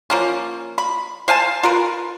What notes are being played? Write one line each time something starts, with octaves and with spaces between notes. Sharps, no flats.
F3 A#3 C#4
B5
C5 F5 G#5 A5
F4 A#4 B4